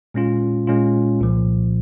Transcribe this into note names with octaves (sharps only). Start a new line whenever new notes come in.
A#2 G#3 C#4 F4
A#2 G#3 C#4 F4
C2 A#2 F3